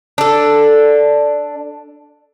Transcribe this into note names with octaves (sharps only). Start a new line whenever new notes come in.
D4 A4